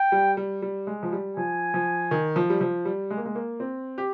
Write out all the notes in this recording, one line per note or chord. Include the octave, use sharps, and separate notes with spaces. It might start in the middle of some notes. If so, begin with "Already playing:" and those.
Already playing: G5
G3
G3
G3
G#3
F3
G3
F3 G#5
F3
D#3
F3
G3
F3
G3
G#3
A#3
G#3
A#3
C4
G4